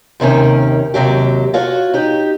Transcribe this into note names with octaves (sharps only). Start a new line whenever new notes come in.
D#2 C3 D#3 C#4
D#2 C3 F#3 G4
F4 F#4 C#5
D#4 G4